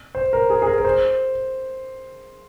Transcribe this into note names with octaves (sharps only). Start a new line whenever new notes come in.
C5
A#4
G#4
G#4
A#4
A#4
C5